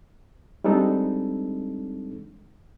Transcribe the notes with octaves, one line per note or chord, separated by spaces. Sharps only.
G3 G#3 C4 D4 D#4 A4